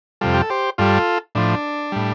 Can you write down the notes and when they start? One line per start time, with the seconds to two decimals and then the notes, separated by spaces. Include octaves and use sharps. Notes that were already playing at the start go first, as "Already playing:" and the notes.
0.21 F2 C3 G3 F4 A4
0.34 G4
0.42 A4
0.50 G4 C5
0.78 G2 G3 F4 A4
1.35 A2 F3 D4
1.92 A2 G3